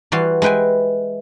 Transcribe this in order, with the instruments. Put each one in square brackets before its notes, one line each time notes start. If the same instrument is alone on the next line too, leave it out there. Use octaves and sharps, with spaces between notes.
[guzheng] E3 G3 F#4 C6
G#3 E4 B4 G5 G#5